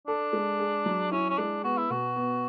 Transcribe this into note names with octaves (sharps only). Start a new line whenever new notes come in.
D4 A4
G#3
G#4
F#3
C#4 E4
C#4
G#3 D4
B3 F#4
E4
B2 F#4
B3